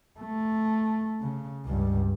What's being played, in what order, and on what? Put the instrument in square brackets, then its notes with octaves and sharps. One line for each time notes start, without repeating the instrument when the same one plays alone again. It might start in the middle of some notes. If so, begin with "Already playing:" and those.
[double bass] A3
C#3
C#2 G2